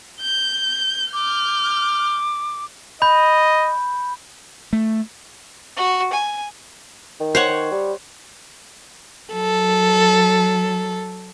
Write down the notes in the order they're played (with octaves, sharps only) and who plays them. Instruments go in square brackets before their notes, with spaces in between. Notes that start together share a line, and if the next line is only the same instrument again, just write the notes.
[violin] G6
[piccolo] D6 [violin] F6 G6
[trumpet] D#5 [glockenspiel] B5 G6
[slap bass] A3
[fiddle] F#4
G#5
[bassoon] D#3
[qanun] C5 C#5 F#5
[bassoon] D#3
G3
[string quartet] F#3 A4